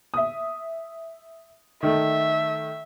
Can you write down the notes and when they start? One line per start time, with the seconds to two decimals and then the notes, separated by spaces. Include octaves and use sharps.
0.14 E5 D#6
1.83 D#3 A3 E5